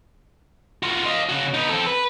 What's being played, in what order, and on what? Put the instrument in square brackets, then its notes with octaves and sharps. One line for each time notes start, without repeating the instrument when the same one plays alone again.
[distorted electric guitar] F4 F#4
D#5 F5
C#3 F#4
B3 D#4
C4 A4
B4